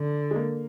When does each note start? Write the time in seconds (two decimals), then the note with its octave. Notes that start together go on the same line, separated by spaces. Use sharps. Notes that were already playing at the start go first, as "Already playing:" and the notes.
Already playing: D3
0.31 G#3
0.35 A#3